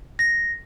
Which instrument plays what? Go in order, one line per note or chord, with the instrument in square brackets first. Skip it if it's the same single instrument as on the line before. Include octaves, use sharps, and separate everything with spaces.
[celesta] A#6